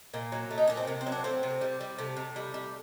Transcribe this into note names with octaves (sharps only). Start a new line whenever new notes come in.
A#2 A#3
F#3
A3
D#4
A#2 D4
C4
C3 A#3
C4
F#3
D4
A3 C4
C3
G3
G3
C3 A3
C3
G3
G3